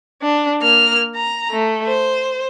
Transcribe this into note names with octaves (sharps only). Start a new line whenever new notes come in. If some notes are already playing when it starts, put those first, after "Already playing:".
D4
A#3 F6
A#5
A3
C5